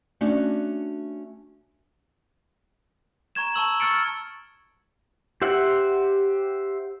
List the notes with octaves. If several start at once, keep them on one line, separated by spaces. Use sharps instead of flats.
A3 C#4 D4 F#4
A#5 C#6 G#6 E7
A5 C#6 E6 F#7
C#6 E6 F6 A6 C#7 D7
G4 C5 E5 F#5